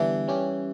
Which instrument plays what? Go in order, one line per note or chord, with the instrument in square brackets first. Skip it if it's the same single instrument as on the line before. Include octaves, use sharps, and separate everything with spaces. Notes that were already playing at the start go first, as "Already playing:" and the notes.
Already playing: [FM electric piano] D3 G3 B3 D4 [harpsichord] E3
[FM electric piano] G3 C#4 G4